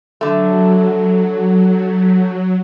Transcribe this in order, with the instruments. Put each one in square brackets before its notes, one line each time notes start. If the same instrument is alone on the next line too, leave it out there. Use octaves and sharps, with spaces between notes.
[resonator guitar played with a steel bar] D3 A3 [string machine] F#3